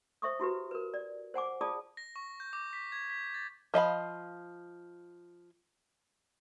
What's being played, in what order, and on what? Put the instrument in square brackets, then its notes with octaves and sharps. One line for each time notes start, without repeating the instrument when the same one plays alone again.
[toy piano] C5 E5 C#6 D#6
E4 F#4 G4 B4
A#4 B4
D5
C5 F#5 G#5 D6
F4 G#4 D5 A5 D#6
[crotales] A#6
C#6
G6
D6
B6
G#6
B6
A6
[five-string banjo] F3 D#5 F5 B5